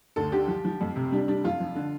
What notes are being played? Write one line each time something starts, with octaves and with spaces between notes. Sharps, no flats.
D2 A4
D3 G4
F3
F3
F2
C3
G3 D4
G3 D4
F2 F4
F3
D3